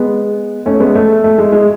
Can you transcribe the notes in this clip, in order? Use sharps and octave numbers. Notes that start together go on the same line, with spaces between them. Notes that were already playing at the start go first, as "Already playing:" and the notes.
Already playing: G#3 B3
A3 C#4
G#3 B3
A3
A3
G#3
G#3